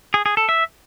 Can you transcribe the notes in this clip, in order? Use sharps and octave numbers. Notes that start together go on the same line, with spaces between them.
G#4
G#4
A4
E5